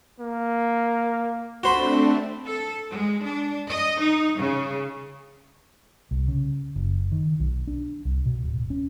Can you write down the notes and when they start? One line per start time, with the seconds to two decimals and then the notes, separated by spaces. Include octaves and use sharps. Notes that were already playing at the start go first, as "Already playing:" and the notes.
0.20 A#3
1.63 A3 C4 D4 F#4 C5 B5
2.46 A4
2.91 G#3
3.25 D4
3.69 D#5
4.00 D#4
4.38 C#3
6.11 C2
6.28 C#3
6.76 F#1
7.12 D#3
7.40 B1
7.67 D4
8.05 C2
8.26 B2
8.43 D1
8.70 C#4